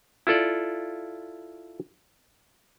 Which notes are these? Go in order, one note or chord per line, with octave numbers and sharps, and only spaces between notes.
E4 F4 A4 D5